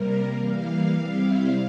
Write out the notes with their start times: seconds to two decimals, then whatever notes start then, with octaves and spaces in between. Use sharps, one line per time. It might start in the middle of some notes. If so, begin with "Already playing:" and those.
Already playing: C3 G3 A#3 A#4
0.35 E3 G3 A#3 F5
0.97 C3 G3 C4 E4